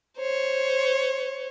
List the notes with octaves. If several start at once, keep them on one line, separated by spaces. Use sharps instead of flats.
C5 C#5